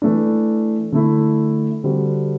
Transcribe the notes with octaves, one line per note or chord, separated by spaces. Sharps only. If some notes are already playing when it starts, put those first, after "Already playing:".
E3 A3 D4
D3 A3 E4
D3 G3 C4 F#4